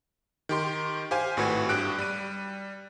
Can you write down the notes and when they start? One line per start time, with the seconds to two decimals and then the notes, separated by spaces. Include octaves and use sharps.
0.49 D#3 G4 C6
1.11 G4 C5 F5 G#5
1.37 G#1 A2 F#4 B4 G#6
1.69 G2 G4 F#6 D7
1.98 G3 D#7